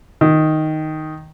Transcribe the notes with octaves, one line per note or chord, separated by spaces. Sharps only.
D#3